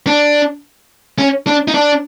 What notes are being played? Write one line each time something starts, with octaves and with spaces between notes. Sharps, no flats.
D4
C#4
D4
D#4
D4